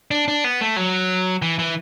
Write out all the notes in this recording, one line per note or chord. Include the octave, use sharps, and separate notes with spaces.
D4
D4
B3
A3
F#3
E3
E3